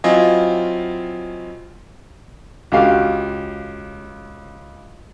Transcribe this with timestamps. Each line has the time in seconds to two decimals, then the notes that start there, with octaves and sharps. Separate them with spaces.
0.04 F#3 C4 E4 F4 D#5 G#5
2.72 C#2 F#4 G4 F5